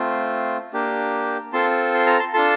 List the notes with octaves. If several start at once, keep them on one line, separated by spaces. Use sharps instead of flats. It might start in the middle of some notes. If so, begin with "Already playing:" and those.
Already playing: A3 C4 F4
A#3 D4 G4
C4 F4 A4 A5 C6
C6
A#5
A5 C6
D4 F4 A4 A5 C6